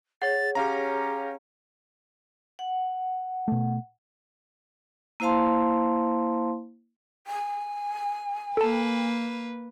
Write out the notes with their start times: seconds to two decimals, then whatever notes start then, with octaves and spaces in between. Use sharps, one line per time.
0.22 G#4 C#5 F#5 A6
0.55 C#4 G4 F5 A#5
2.59 F#5
3.48 B2 A3
5.20 A#3 E4 C5 F5 A5 C6
7.27 G#5
8.57 A#3 A4 B4 A5